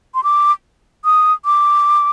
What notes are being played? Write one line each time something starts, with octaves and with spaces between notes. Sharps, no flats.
C6
D6
D#6
D6